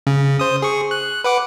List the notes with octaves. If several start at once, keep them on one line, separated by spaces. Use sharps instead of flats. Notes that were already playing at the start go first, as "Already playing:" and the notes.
C#3
C5 D#6
G#4 C#6
F#6
B4 F#5 D6